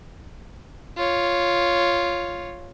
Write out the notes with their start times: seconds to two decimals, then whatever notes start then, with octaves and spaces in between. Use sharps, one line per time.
0.97 F4 C#5